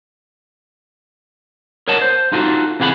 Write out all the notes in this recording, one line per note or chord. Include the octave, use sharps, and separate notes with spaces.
A#4 C#5 D#5 F#5 A5
C5
D#4 F4 F#4 A4
C3 E3 F4 G#4 F#5 B5